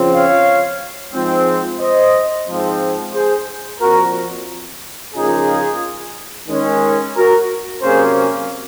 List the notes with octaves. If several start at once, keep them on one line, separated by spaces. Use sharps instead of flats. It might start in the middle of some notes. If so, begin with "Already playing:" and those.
Already playing: C#3 F3 C4
C#5 F5
G#2 F3 G#3 C4
C5 D#5
G#2 F3 C4
G#4 C5
A#2 F3 C4 F#4 A#4
C#3 F3 A#3 D#4 F4 G#4
D#3 G#3 C#4
F#4 A#4
C3 F#3 A#3 C#4 G#4 C5